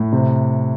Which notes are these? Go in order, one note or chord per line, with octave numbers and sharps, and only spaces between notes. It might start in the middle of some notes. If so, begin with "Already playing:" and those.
Already playing: A2
C3